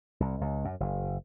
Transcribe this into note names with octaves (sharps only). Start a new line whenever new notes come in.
C2
C#2
F#2
F#1